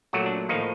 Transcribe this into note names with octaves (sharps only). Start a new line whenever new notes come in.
A#2 F#3 A3 F#4
D4
A2 D#3 F3 A#3 D#4